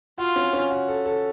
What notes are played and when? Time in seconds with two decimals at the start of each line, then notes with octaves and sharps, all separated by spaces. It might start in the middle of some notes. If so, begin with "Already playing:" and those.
0.18 F4 F#4
0.36 C#4
0.53 C#4
0.71 F#4
0.88 A4
1.06 A4